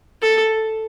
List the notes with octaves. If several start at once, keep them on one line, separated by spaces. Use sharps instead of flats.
A4